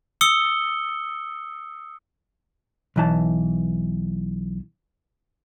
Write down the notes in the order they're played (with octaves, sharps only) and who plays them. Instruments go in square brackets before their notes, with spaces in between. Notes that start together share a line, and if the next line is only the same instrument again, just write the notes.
[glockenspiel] D#6 E6 C#7 G7
[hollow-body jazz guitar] B1 E3 A5